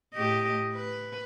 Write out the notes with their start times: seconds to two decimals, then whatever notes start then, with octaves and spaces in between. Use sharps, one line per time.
0.14 A2 G4 D#5
0.74 B4